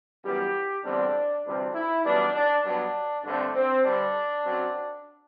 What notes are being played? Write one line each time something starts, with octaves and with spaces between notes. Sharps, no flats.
F#2 E3 G3 B3 G4
E2 D3 G3 C4 D4
D2 C3 E3 G3 C4 D4
E4
F#2 E3 G3 B3 D4
D4
G2 F#3 B3 D4
G2 D3 A3 C4 D4
C4
G2 D3 G3 D4
F#2 F#3 C4